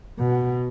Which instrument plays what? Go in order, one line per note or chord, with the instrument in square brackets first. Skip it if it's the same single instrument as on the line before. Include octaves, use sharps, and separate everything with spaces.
[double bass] B2